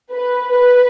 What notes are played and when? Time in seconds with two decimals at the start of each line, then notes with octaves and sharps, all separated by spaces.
0.11 B4
0.51 B4